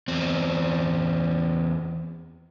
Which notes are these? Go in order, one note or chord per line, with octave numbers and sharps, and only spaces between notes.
E2 C4